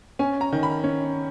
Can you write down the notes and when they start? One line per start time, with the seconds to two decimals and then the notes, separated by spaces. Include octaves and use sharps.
0.19 C#4 G#5
0.41 A#5
0.53 D#3
0.63 B5
0.84 C#4